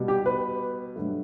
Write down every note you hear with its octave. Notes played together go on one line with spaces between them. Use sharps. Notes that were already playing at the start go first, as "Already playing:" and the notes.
Already playing: B2 G3
G4
B4
G2 F#3 A3